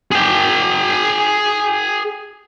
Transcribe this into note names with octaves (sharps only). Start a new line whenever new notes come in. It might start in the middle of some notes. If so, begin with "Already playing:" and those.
G#4 G5